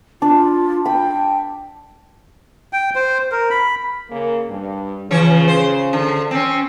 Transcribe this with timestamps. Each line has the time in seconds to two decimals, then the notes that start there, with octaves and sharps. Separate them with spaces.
0.22 D4 F4
0.85 G5 B5
2.73 G5
2.95 C5
3.32 A#4
3.51 B5
4.10 C#3 A#3 A#4
4.49 G2
5.11 C#3 E3 F3 C#5
5.48 C5
5.93 D3
6.31 C4 C#4